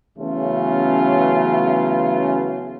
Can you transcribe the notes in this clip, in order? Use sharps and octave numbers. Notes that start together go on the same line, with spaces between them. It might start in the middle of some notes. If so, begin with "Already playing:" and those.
E2 C#3 F#3 A3 C#4 F4